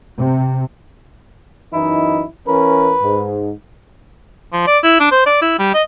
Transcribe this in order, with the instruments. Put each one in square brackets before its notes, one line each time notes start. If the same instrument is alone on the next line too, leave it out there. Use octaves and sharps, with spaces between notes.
[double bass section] C3
[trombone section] F#2 E3 D#4 [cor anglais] E4
[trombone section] E3 C#4 A#4 [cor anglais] B4
[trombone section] G#2
[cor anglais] F3
D5
E4
D4
C5
D5
E4
G3
D#5